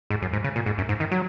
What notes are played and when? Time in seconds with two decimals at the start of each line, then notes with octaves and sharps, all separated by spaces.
0.10 G#2
0.22 F#2
0.33 G#2
0.44 C#3
0.56 A#2
0.66 G#2
0.78 F#2
0.89 G#2
1.00 D#3
1.11 F#3